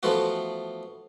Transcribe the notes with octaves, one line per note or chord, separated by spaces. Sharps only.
E3 F3 A3 B3 F4 F#4